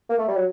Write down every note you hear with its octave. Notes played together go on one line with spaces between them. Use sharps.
A#3
A3
G3
F#3